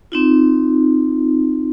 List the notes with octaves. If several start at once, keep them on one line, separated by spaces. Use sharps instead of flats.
C4 D#4 F4